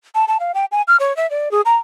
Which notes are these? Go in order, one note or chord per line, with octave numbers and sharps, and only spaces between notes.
A5
A5
F5
G5
G#5
F6
C#5
E5
D5
G#4
A#5